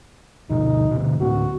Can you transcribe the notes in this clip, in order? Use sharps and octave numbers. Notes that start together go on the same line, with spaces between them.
D2 B2 D#4
B2 D3
D2 A2 B3 F#4